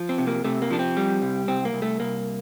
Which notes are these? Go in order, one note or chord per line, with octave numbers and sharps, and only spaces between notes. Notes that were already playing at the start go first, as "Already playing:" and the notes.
Already playing: F3
C4
C3
A#3
C3 A3
A#3
F3 D4
C4
G3
C2
C2 C4
A#3
C2
A3
C2 A#3